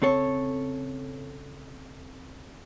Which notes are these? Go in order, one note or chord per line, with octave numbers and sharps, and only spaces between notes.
C#3 C4 A4 C#5